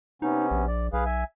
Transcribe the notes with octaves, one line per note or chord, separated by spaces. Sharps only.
C3 B3 C#4 D#4
A#1
D5
B1 G#4 B4 F5
E5 G#5